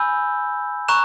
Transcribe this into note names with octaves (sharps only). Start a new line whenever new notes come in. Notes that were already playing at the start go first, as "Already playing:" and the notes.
Already playing: G#5 B5 E6 G6
A#5 C#6 F#6 E7